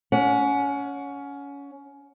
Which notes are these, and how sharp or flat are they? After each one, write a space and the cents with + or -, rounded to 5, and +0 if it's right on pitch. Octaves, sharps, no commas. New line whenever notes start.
C#4 +20 F#5 -25